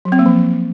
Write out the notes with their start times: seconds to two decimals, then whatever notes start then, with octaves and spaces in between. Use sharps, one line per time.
0.05 F#3
0.12 C4
0.19 A#3
0.26 F3